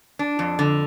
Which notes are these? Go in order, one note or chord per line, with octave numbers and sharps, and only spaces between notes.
D4
F2
D3